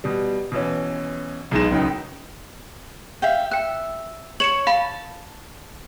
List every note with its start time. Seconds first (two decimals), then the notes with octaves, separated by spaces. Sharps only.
0.04 B2 G3
0.52 B2 E3 C#4
1.51 B1 B2 G#3 D#4 E7
1.71 C#2 F#2 D#4 G5
3.22 E5 F5 G5
3.51 E5 G5 F#6
4.40 C#5 C#7 E7 F#7
4.67 F5 A5 B5